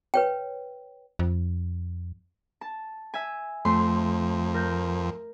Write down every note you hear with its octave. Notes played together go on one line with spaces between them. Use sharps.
B4 C#5 G5
F2
A5
E5 G#5
F2 A3 C6
A#4 G6